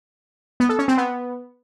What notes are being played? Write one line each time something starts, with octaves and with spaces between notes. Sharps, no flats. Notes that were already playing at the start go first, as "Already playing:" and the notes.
B3
A4
C#4
C4
B3